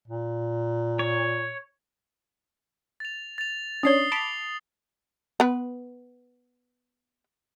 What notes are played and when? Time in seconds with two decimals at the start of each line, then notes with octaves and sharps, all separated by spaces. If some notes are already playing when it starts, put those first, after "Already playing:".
0.08 A#2
0.99 C#5
3.00 A6 F7
3.38 A6 F7
3.83 C#4 D4 C#5 D#6 C7 G7
4.12 A5 B5 D6 C7 F7
5.40 B3 B4